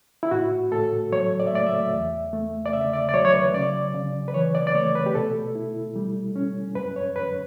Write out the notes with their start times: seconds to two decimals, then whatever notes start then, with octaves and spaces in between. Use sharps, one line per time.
0.23 E4
0.31 A2 F#4
0.72 A2 A4
1.12 F#3 C#5
1.40 D5
1.47 E5
1.52 A3 D5
1.66 E5
1.92 E2
2.33 A3
2.66 D5
2.73 C#3 E5
2.93 D5
3.09 D5
3.14 F#3 C#5
3.25 C#5
3.34 B4
3.54 C#3 D5
3.94 C#3
4.28 B4
4.34 E3 C#5
4.55 D5
4.67 D5
4.75 A3 C#5
4.95 B4
5.06 G4
5.14 B2 A4
5.55 E4
5.96 G3
6.36 C#4
6.75 F#2 B4
6.96 C#5
7.16 F#2 B4